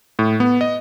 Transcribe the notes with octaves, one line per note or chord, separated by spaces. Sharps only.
A2
B3
D#5